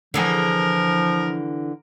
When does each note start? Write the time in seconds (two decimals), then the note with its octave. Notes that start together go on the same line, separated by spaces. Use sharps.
0.14 D3 E3 F3 G#4 A#4